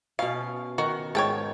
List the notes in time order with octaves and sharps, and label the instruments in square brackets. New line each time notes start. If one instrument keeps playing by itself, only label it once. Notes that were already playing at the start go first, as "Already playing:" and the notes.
[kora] B2 C#4 [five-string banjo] F5
[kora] D#3 [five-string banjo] F#4
[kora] G#2 [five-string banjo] C#5 G5 A5